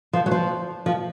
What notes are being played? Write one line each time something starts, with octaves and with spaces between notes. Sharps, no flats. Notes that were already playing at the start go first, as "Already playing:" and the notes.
F3
F#3
F3
F3